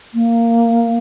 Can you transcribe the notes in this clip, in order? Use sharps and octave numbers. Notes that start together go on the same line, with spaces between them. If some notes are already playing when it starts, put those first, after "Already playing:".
A#3